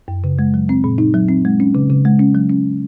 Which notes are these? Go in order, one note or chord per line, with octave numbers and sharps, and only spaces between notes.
F#2
C#3
G#3
F#3
C4
A#2
D#4
F#3
C4
G#3
C#4
C#3
C#3
G#3
C#4
F#3
C#4